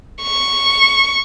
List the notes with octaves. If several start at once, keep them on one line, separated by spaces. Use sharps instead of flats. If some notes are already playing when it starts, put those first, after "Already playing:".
C#6